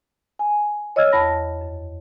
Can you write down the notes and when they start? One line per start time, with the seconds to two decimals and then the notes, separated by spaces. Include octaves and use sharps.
0.39 G#5
0.96 C#5 D#5 E6 F6 G#6
1.12 E2 F#5 A5 B5 A#6
1.61 F#2